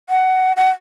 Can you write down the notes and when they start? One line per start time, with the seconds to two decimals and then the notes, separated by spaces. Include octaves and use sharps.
0.10 F#5
0.57 F#5